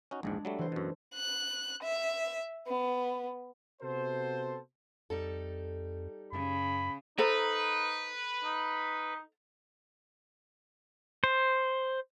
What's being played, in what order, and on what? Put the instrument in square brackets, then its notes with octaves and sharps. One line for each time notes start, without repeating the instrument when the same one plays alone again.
[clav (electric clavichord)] C#4 D#4 F#4
[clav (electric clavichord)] A#1 E2 G#2 [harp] G#3 D4
[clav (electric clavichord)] F#3 G3 A3 [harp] A4
[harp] E3 C5
[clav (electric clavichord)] F#2 B2
[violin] F#6
E5
B3
[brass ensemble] C3 B3 F#4 A4 C5
[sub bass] F2 [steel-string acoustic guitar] G3 D#4 A4
[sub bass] F#2 [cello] C#3 [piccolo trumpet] B5
[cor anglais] D#4 [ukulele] A4 C5 A#5 [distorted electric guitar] B4
[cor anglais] D#4
[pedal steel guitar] C5